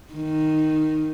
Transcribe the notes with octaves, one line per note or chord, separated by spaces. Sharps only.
D#3